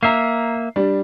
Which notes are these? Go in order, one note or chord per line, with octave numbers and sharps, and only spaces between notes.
A#3 E5 A#5 C7
G3 D4